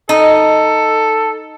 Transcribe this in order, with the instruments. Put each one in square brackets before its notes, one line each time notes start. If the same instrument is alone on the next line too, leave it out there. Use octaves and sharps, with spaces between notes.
[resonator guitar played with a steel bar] D#4 [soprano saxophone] A4